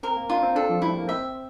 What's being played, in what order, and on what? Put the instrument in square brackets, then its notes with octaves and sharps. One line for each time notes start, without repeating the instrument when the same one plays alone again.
[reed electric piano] C4 [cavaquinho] A#4
[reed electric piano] A#3
[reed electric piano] D4 [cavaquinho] F4
[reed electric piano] C4
[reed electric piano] D4 [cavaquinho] A4
[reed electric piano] F3
[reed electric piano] G3 [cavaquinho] E4
[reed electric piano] A3
A#3
[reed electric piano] C4 [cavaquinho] E5